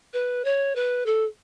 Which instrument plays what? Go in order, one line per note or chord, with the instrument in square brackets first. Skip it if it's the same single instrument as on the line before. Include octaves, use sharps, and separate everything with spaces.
[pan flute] B4
C#5
B4
A4